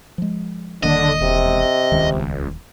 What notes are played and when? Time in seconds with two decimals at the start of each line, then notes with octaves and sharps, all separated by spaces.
0.18 F3 G#3
0.83 D#1 D3 D#3 A#3 D4 D#5
1.21 E1 C3
1.92 D#1 C#2 D#3